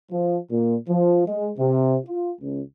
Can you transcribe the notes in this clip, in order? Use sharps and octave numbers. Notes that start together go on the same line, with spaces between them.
F3
A#2
F3
G#3
C3
F4
C#2